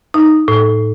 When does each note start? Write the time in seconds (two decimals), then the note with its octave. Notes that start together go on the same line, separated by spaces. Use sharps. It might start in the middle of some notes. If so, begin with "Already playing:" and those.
0.14 D#4
0.48 A2